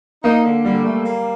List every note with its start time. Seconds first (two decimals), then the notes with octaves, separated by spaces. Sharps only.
0.23 A#3 D#4
0.44 D3
0.65 D3 G3
0.84 A3
1.05 A#3